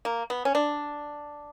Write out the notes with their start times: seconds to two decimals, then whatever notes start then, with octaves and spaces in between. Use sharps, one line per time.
0.05 A#3
0.30 B3
0.45 C#4
0.55 D4